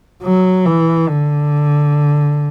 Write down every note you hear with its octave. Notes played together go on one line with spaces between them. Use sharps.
F#3
E3
D3